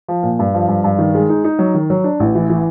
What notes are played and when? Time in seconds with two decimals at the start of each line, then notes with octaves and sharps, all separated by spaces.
0.08 F3
0.23 A#2
0.39 G2
0.54 F3
0.68 G2
0.84 G2
0.99 D#3
1.15 G#3
1.30 D#4
1.44 D#4
1.59 F#3
1.74 D#3
1.90 F#3
2.04 D4
2.20 A1
2.35 E3
2.50 E3